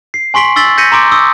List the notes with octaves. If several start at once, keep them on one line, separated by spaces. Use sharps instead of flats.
C7
G#5 C6 C#6 B6 D7 F#7
C#6 E6 A6 B6 F#7 G7
G6 A#6 B6 C#7 D#7
A#5 C6 D6 D7
C6 C#6 D#6 E6